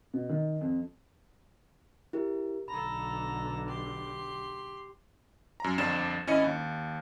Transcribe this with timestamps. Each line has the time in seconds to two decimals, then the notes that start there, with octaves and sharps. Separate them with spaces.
0.14 B2
0.29 D#3
0.61 F2
2.13 E4 G4 A#4
2.68 B1 D3 A4 A#5 B5
3.68 G4 C6
5.60 F#2 A#5
5.78 G1 F2 D4 A6 E7
6.27 G#1 C#4 E4 D#5 C#7
6.44 D#2